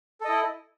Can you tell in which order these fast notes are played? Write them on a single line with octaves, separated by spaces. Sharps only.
A4 D#5 E4